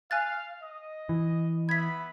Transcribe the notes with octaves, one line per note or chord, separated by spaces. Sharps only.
F5 G#5 F#6 A6
D#5
E3
B3 E5 B5 G#6 B6